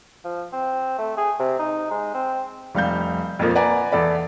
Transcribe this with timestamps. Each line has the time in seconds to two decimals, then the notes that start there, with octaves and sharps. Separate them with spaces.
0.24 F3
0.52 C4
0.98 A3
1.17 G#4
1.39 C3
1.59 D#4
1.91 G#3
2.14 C4
2.75 F1 G3 F5 G6
3.39 F2 A#2 F3 A#3
3.55 B4 D5 F#5 G#5 A#5
3.92 E2 A4 D5 B5